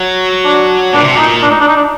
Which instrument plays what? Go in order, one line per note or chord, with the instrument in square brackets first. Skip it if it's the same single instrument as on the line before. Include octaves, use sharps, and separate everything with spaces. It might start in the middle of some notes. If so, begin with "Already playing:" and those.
Already playing: [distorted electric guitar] F#3
[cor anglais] D4
[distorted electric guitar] A#2 [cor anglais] D4
[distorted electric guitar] C3
[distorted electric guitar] A#2 [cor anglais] D#4
[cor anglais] D4
D#4
D4
D#4
D4